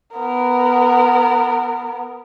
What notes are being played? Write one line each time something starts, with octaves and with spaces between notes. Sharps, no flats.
B3 A#4